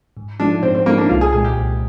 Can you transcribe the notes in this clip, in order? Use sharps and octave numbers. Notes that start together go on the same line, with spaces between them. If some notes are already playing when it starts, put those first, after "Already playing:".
G#2
F3 G#3 D4 D#4
G#2 C4
C4
F3 G#3 A#3 D#4
D4
C2 F4
G#4
A#2 G#3 G#4
G4
C2